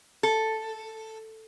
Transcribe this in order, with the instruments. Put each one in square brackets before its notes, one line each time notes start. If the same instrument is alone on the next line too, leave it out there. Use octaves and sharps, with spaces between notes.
[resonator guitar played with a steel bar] A4